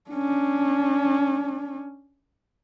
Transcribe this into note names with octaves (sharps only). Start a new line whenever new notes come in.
C#4 D4